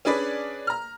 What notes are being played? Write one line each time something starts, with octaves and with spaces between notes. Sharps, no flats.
C#4 D4 G#4 B4 D5
A#5 F6